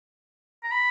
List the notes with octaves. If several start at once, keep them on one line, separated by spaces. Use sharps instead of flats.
A#5
B5